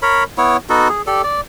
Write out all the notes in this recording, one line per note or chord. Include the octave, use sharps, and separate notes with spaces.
A#4 C#5 B5
B3 E4 C#5
B3 D#4 F#4 A4
G#4
G4 A4 D5
D5